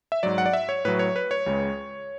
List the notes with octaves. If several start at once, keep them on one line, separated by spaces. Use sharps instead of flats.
E5
G#2 F#3 D5
F#5
D5
E5
C#5
A2 F#3 B4
C#5
B4
C#5
C#2 C#3 G#3